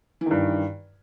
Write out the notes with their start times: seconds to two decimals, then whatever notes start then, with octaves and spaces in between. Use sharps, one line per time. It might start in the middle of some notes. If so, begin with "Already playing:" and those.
0.21 E3
0.26 D#3
0.31 G2